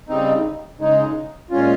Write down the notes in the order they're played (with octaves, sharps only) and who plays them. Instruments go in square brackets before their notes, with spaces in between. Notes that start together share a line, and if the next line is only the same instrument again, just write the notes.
[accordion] C#3 G3 C4 D#4
C#3 G#3 D#4
A#2 G#3 C#4 F4